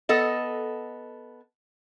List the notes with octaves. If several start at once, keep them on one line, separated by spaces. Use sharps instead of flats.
B3 A4 D#5